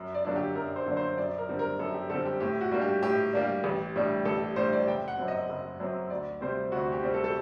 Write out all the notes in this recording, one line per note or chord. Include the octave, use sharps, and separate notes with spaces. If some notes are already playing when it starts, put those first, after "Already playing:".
Already playing: F#2
D5
D3 F#3 A#3 D4
G4
F#2 A#4
C5
D3 F#3 A#3 D4
C5
F#2 D5
A#4
D3 G3 C4
A#4
F#2 A4
G4
D3 G3 C4 A4
G4
A2 G4
F#4
G3 A#3 D4
G4
A2 G4
G3 A#3 D4
A1
A2 G3 D4
A1 A4
A2 G3 D4 C5
D5
F#1 G5
F#5
F#2 F#3 C4
D#5
F#1
F#2 F#3 C4
D2 D5
C3 G3 C4 C5
D2 F#4
G4
C3 G3 C4
A4
A4